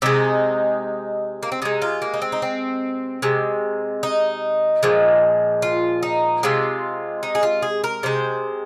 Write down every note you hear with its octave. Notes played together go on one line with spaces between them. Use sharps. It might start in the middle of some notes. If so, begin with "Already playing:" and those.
C3 G#3 D#4
A#3
C4
C3 G#3 D#4
F4
A#3
D#4
C4
D#4
C4
C3 G#3
D#4
A#2 F3 G#3
F4
D#4
C3 G#3 F4
D#4
G#4
F4
G#4
A#4
C3 G#3 C5